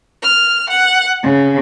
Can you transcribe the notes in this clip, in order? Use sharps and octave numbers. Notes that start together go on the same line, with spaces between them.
F6
F#5
C#3